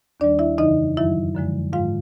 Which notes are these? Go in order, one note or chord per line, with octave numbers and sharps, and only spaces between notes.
D#2 D#3 G3 D4 D5
E4 E5
F2 C#3 E3 D#4 D#5
F#2 D#3 F#3 E4 E5
F#2 D3 F3 G#3
G#2 D#3 G#3 F4 F5